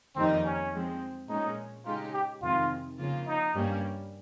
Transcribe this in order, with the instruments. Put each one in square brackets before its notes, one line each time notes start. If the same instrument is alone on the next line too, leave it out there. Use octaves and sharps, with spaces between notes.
[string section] F2 D#3 G3 A#3 D#4 [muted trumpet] C4
[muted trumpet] C#4
[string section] F3 G#3 C4
[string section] A#2 G#3 C#4 [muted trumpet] D#4
[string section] C#3 G#3 D#4 G4 [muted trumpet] F4
[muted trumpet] G4
[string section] F2 C3 D#3 G#3 [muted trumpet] F4
[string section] C#3 F3 A#3 F4
[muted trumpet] D#4
[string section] G2 G3 A#3 C#4